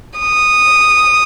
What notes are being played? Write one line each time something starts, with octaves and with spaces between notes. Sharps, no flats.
D#6